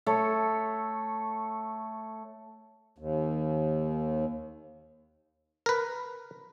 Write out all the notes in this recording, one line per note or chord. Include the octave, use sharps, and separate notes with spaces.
A3 A4 C#5
D#2
A#4 B4